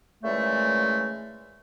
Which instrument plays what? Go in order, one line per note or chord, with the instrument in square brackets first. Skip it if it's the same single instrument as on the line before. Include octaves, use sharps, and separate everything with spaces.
[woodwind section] A#2 C#3 E3 G#3 A3